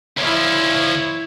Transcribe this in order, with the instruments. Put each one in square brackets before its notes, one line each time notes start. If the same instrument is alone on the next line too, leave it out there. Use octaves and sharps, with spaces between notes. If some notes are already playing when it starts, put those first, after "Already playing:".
[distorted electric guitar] D2 F3 [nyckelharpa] E4 C#5